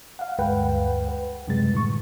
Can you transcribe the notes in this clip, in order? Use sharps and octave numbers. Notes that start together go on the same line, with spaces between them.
F5 F#5
D2 G2 G#3 B4 F#5 G5
B4
F#2 C3 G3 G#3 A6
A2 D3 C#6